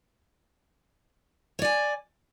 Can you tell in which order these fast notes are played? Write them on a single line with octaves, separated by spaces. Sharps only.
C#5 D5 G#5